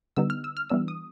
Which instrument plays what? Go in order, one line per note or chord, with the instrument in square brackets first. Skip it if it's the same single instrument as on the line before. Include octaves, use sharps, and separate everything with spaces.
[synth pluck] D3 G3 B3 D#4 E6
F6
E6
F6
E3 G3 B3 D4 E6
D#6